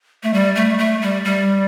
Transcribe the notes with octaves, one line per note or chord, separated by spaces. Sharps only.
A3
G3
A3
A3
G3
G3